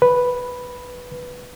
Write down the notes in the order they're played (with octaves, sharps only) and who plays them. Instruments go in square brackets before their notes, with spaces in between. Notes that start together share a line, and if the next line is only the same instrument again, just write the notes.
[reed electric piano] B4